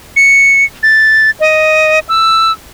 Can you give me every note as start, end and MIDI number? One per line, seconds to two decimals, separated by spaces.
0.16 0.65 97
0.83 1.31 93
1.40 1.99 75
2.09 2.52 88